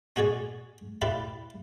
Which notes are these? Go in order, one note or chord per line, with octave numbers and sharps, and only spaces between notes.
C#4 F#4 G#4 C#5 D5
E4 G4 B4 D5 F5